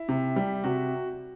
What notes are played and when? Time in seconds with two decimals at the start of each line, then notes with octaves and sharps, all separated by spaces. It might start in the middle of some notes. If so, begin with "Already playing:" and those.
Already playing: E4
0.09 C3
0.36 G3
0.64 C3 F#4